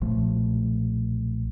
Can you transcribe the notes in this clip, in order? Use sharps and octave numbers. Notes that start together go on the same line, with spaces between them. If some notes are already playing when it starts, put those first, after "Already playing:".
B1 A#2 F3 A3